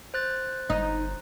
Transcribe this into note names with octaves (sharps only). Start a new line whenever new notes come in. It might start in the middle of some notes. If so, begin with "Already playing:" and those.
C5 F#6 A6
G1 D#4